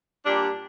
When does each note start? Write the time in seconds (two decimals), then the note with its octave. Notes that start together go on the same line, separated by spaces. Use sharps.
0.25 A#2 G3 D4